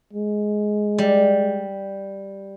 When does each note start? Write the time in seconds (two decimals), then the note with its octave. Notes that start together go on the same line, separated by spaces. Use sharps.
0.13 G#3
0.98 G3